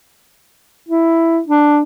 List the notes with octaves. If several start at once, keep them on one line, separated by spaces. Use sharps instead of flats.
E4
D4